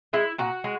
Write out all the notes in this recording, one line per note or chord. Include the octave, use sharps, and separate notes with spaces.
G#3 E4
A#2 F#4
G#3